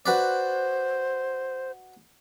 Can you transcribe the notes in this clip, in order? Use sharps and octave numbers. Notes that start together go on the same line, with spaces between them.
F#4 B4 C5 D5